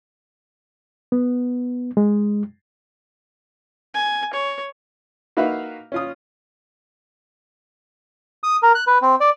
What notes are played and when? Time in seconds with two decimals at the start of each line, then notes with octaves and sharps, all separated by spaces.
1.12 B3
1.97 G#3
3.95 G#5
4.34 C#5
5.37 A#3 D#4 F#4 B4 E5 F5
5.92 C#4 F4 D#6
8.44 D#6
8.63 A#4
8.75 F#6
8.87 B4
9.02 C4
9.20 D5